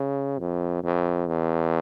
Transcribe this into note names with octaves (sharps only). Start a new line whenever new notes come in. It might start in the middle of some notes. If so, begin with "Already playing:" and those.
Already playing: C#3
F2
F2
E2